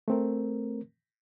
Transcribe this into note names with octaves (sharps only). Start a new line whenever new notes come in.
A3 C4 A#4